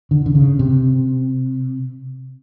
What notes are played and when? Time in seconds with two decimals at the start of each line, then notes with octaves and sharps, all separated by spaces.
0.11 D3
0.26 D3
0.35 C#3
0.59 C3